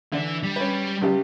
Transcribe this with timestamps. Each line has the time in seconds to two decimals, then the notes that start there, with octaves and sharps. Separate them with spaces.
0.12 D3 E3 D4
0.43 G3
0.56 C#4 B4
1.01 C#2 G3 G4